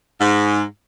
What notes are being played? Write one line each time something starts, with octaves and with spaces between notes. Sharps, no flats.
G#2